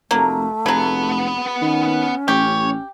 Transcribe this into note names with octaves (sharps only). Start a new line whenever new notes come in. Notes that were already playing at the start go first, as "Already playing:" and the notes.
F1 F#3 A3 A#3
F1 C#3 F#3 B3 B4
D#3 C#4
A1 G4 C#5